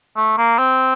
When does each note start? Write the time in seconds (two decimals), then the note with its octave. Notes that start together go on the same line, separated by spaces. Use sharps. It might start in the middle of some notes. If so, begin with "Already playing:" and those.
0.16 A3
0.38 A#3
0.59 C4